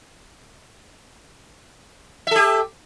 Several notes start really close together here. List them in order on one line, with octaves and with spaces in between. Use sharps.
E5 A4 G4